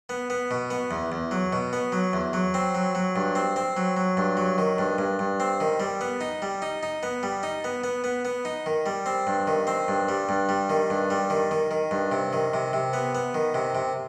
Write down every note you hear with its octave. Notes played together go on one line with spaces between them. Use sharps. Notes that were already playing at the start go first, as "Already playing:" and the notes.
B3
B3
B2
B3
E2
E2
F#3
B2
B3
F#3
E2
F#3
C4
F#3
F#3
G2
C4
C4
F#3
F#3
G2
F#3
D#3
G2
G2
G2
C4
D#3
G3
B3
D#4
G3
D#4
D#4
B3
G3
D#4
B3
B3
B3
B3
D#4
D#3
G3
C4
G2
D#3
C4
G2
G3
G2
G3
D#3
G2
G3
D#3
D#3
D#3
G2
C3
D#3
C3
C3
B3
B3
D#3
C3
C3